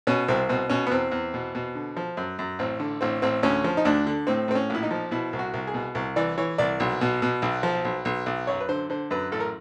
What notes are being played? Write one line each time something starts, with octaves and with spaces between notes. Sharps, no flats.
B2 C#4
C2 C4
B2 C4
B2 C#4
B3
E2 C4
E2
B2
B2
D3
F3
F#2
F#2
A1 C4
D3
A1 C4
A1 C4
D2 C#4
F3
D#4
D2 D4
D3
A2 C4
A2 C4
C#4
A#1 E4
D#4
F3
B2 E4
C2
F#4
C2
G#4
B2
C2
E3 D5
E3 C#5
C2 D5
B1
B2
B2
B1
F3
B1
B1
B1
F#2 C#5
B4
D3 C5
D3 C5
F#2 B4
A1 A4
A#4